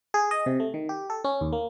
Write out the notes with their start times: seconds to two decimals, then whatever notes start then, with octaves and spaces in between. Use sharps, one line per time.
0.14 G#4
0.31 D#5
0.46 C3
0.60 A3
0.74 D#3
0.89 G4
1.10 A4
1.24 C#4
1.41 D#2
1.52 A#3